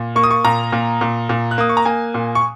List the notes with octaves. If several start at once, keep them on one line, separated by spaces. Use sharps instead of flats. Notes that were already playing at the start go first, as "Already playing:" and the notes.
Already playing: A#2
A#3 C#6
D#6
C#6
A#2 A#5
A#2
A#2
A#2
F#6
A#3 D#6
C#6
A#5
A#3 G#5
A#2
C#6